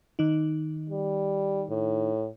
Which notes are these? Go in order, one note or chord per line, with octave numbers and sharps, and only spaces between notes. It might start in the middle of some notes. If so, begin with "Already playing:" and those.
D#3 D#4
G3
A2